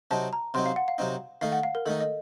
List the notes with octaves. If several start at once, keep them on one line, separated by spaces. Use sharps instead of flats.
C3 F#3 C4 D#4 A5
A#5
C3 F#3 C4 D#4 C6
F5
F#5
F5
C3 F#3 C4 D#4
D#3 A3 D#4 F5
F#5
F5
A#4
D#3 A3 D#4 A4
D#5